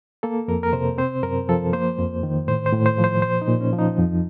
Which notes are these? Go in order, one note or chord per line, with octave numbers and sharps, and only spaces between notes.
A#3 A4
F2 A#4
A#4
C3 C5
C4 C5
F#2 A#4
F3 A4
A#3 C5
F2
D#3
A2 C5
C5
A2
C5
F3
C5
A#2 C5
D#4
A#2
C#4
F3
D#4
F2